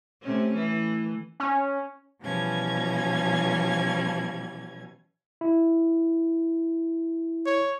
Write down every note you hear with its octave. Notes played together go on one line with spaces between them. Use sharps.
C3 A3 C#4
E3 A3
C#4
B2 E3 F3 G3 C#4 G#6
E4
C#5